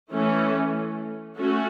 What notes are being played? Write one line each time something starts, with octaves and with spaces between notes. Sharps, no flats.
E3 A3 C#4
A3 C#4 F#4